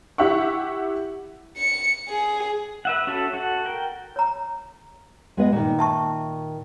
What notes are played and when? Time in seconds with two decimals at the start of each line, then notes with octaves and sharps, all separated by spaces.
0.18 E4 G4 E5 F#5 C#6
1.57 C#7
2.08 G#4
2.85 B4 E5 F#5
3.07 C#4 F#4 A4 E5
3.33 F#4 A4 F#5
3.65 A#4 G5
4.16 C#5 A#5
5.37 G#3 B3 D#5
5.52 A#2 D#3
5.79 E5 A5 C#6